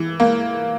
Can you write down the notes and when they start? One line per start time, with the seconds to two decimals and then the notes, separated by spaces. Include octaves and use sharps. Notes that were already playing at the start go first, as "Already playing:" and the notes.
Already playing: E3
0.20 A#3